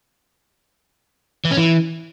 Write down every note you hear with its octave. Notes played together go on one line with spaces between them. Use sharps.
E3
C#4
E3